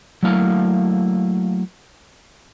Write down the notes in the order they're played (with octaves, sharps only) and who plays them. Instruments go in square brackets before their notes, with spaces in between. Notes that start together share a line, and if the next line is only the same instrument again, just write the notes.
[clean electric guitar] F#3 A3 A#3 E4 F5